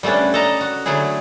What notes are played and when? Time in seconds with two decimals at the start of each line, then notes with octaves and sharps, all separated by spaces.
0.03 G3 A3 B3 C#4 D4
0.34 A4 D#5 A5 A#5
0.61 F#4
0.86 D3 F#3 A3 E4 G#4